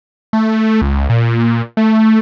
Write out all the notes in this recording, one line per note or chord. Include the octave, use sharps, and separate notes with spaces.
A3
C#2
A#2
A3